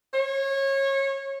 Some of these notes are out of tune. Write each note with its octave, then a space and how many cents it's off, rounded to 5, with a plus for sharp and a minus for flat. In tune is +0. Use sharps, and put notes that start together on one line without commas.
C#5 -25